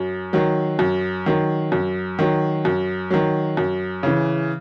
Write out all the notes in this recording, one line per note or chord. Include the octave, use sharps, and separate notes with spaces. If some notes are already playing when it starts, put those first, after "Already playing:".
Already playing: F#2
D#3 F#3
F#2
D#3 F#3
F#2
D#3 F#3
F#2
D#3 F#3
F#2
C#3 E3